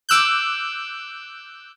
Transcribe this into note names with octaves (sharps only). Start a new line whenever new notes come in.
D6 E6 F#6 G6